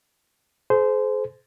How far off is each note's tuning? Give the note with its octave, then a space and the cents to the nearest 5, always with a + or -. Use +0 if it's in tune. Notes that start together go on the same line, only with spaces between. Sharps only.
G#4 +40 C5 -20